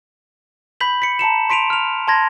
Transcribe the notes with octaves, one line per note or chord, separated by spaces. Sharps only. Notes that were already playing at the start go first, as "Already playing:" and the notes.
B5 G6 B6 F#7
B6 C#7
A5 A#5 C#7 E7
C6 B6 D7 D#7 F7
F6 F7
A5 C6 G#6 A#6